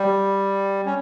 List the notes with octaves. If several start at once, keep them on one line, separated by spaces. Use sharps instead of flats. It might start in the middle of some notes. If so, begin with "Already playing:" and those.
Already playing: G3
C#4